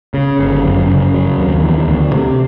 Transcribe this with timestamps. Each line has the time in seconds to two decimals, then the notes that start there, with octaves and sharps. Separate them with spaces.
0.14 C#3
0.39 G1
0.64 F#2
0.89 C#3
1.14 F#3
1.38 D#2
1.63 E3
1.88 D2
2.13 C3